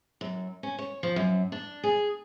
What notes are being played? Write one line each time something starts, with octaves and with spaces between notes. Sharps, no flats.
F#2
C#4
C#5
F3
F#2
D4
G#4